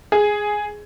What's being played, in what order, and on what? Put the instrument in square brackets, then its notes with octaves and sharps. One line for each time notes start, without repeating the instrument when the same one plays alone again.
[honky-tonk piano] G#4